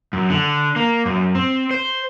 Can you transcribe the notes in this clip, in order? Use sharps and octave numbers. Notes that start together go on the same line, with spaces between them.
F#2
D3
A#3
F#2
C4
C5